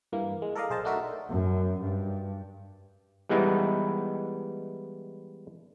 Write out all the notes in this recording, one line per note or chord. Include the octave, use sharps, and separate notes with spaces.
G2 E3 A#3
G#3
A4 A#4 D5 D#5 F5
B1 G#4 C5 D#5 A5
A3 D4 D#4 F#4 A#4 E5
F#2
G2
E3 G3 G#3 B3 D#4 E4